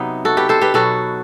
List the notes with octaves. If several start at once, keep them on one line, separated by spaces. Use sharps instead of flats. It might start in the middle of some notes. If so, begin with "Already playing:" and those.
Already playing: C3 F#3 B3 D#4
F#4 A4
G4 B4
A4 C5
G4 B4
B2 F#3 F#4 A4